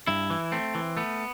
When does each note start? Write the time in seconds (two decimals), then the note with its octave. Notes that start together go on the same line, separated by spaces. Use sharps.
0.07 G2 E4
0.30 E3
0.52 A3 C4
0.75 E3
0.97 A3 B3